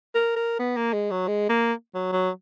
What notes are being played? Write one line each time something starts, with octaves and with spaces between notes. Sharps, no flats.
A#4
A#4
B3
A#3
G#3
F#3
G#3
A#3
F#3
F#3